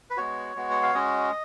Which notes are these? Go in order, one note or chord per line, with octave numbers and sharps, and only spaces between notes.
B4
G#3 B3 F#4 C#5
G#3 B3 F#4
F#5
F5
G#3 C#4 F#4 D#5